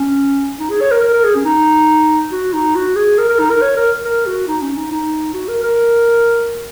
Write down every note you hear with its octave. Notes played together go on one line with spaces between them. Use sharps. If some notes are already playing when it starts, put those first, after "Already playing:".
Already playing: C#4
D#4
G#4
C#5
A#4
A#4
A#4
G#4
C#4
D#4
F#4
D#4
F#4
G#4
A#4
A#4
D#4
A#4
C#5
A#4
A#4
F#4
D#4
C#4
D#4
D#4
F#4
A#4
A#4